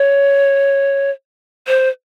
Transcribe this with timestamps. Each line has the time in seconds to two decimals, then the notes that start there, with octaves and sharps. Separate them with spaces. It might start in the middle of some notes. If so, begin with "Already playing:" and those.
Already playing: C#5
1.67 C5